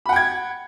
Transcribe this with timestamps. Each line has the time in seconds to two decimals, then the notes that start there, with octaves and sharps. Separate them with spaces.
0.06 B5
0.09 F#5
0.13 G5
0.16 G#6